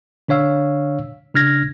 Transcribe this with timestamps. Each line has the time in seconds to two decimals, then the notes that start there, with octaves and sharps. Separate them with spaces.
0.28 D3 D4 C#5 F5 E6
1.34 C#3 D4 F6 G#6 A#6